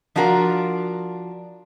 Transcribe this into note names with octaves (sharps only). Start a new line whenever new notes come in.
F3 D4 F4 F#4 A#4